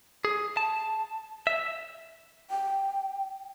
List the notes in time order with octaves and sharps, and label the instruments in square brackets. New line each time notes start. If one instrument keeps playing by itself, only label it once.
[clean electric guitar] G#4
A5
E5
[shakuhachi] G5